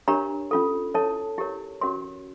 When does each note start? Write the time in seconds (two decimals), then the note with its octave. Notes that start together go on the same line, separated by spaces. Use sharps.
0.08 D4 G4 A#4 C#5 A#5
0.51 C#4 F4 A4
0.94 E4 A4 C#5 A5
1.38 E4 G4 A#4 C#5
1.81 C#4 F#4 A#4 C#5 C6